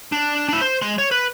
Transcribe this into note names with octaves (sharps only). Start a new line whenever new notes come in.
D4
D4 E4
C5
G#3 C6
C#5
B4